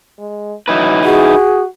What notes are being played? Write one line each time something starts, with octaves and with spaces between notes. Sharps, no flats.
G#3
F#3 D#4 E4 B4
F#4 G#4